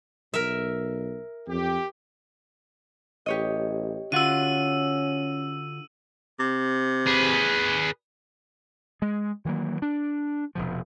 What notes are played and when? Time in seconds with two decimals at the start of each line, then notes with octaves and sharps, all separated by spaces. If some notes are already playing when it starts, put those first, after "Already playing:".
0.34 B1 A#4 E5
1.48 F2 G4
3.26 A1 G4 C#5 D#5
4.12 D3 C#4 F4 F#4 E6 D#7
6.39 C3
7.07 G#4 B4
9.02 G#3
9.45 D#3 E3 F#3 A#3
9.82 D4
10.55 F1 B2 F3